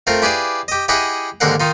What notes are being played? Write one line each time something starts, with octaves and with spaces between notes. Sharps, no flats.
A3 C4 F4 A#4
E4 G4 G#4 B4 D5 F5
G4 D#5
E4 G4 G#4 D#5 E5 F#5
D#2 G#2 D3 A#4 F5 F#5
D#3 D#4 F4